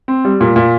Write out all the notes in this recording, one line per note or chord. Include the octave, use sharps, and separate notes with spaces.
C4
G3
A#2
A#2